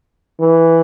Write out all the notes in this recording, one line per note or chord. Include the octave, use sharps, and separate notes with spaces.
E3